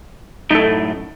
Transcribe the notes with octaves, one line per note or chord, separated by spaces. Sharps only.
F#2 A2 A3 D#4 A4